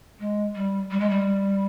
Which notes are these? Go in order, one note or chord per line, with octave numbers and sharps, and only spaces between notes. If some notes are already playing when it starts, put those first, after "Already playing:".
G#3
G3
G3
G#3
G3